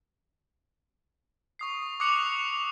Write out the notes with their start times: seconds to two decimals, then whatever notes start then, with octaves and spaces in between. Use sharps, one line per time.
1.59 C#6 D#6 C7
2.00 D6 D#6 F#6 C#7 F7 F#7